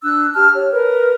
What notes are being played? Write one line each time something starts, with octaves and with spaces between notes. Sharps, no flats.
D4 E6 F#6
G4 A5 F6
C#5
A#4 B4